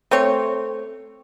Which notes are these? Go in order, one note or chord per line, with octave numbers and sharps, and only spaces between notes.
A3 C4 C#5